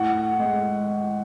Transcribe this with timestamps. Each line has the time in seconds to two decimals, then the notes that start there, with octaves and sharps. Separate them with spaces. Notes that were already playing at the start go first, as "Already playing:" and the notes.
Already playing: A2 F#5
0.40 G#3